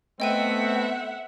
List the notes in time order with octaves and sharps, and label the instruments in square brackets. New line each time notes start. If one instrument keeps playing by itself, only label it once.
[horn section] A3 B3 C4 [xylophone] D#5 G5 D#7 [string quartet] E5 F#5